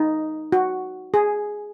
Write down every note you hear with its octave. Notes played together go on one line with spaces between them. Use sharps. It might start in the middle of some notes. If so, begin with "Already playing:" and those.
Already playing: D#4
F#4
G#4